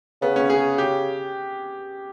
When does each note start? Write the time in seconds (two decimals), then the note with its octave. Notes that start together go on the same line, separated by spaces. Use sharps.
0.22 C#3 B3
0.36 C#4
0.50 G#4
0.78 G4